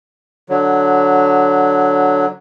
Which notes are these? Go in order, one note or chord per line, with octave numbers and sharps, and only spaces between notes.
D3 F#3